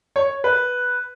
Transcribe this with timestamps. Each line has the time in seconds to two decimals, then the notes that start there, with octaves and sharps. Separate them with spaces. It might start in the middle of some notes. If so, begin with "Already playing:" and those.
0.16 C#5
0.44 B4